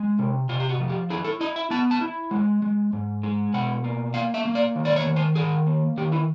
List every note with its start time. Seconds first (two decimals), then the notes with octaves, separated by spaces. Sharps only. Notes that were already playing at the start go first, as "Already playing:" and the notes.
Already playing: G#3
0.19 C3
0.49 C3 F4
0.60 G4
0.69 F#4
0.80 F3
0.89 G4
1.10 E4 G#4
1.24 A4
1.41 E4 D#5
1.56 E5
1.70 B3 A5
1.91 A5
2.01 E4
2.31 G#3
2.62 G#3
2.93 G#2
3.23 G#3
3.54 B2 F#5
3.84 A#3
4.14 A#3 F5
4.34 E5
4.45 A#3
4.55 D5
4.76 D#3
4.85 D5
4.96 C#5
5.06 D#3
5.16 C5
5.36 D#3 G#4
5.67 A#3
5.97 D#3 G4
6.12 E4